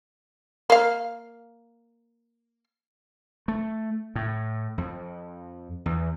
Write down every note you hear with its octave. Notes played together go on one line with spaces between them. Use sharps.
A#3 F5
A3
A2
F2
E2